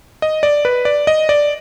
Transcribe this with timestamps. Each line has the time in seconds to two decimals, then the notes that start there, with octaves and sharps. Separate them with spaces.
0.22 D#5
0.43 D5
0.65 B4
0.85 D5
1.07 D#5
1.29 D5